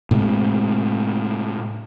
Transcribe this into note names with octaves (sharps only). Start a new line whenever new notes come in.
A2 C3 G#3